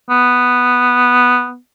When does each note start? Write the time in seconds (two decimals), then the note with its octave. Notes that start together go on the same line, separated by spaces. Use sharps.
0.10 B3